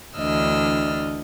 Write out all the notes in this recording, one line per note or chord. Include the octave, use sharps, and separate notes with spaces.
D2 E3 D4 D#5 E6 F6